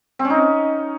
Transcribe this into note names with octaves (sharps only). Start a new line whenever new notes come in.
C4
C#4
D#4